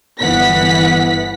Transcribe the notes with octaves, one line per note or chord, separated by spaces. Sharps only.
G1 E3 B3 F#5 B6